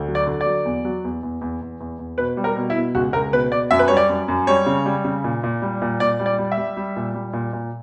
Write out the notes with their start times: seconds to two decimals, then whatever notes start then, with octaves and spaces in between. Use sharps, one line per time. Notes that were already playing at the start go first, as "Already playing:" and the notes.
Already playing: D2
0.08 F#3
0.15 D5
0.27 D3
0.41 D5
0.46 F#3
0.65 E2
0.85 F#3
1.04 E2
1.23 E2
1.41 E2
1.61 E2
1.80 E2
1.99 E2
2.18 B2 B4
2.37 G3
2.44 A#4
2.56 B2
2.70 E4
2.76 B2
2.95 C#2 F#4
3.13 C#2 A#4
3.33 B2 B4
3.52 B2 D5
3.71 F#2 E5
3.79 B4
3.88 G3 C#5
3.97 D5
4.09 F#2
4.28 F#2
4.47 G3 C#5
4.66 C#3
4.86 G3
5.04 C#3
5.24 A#2
5.44 A#2
5.62 G3
5.82 A#2
6.00 A#2 D5
6.19 G3
6.26 D5
6.38 G3
6.52 E5
6.58 G3
6.77 G3
6.96 A#2
7.14 G3
7.33 A#2
7.53 A#2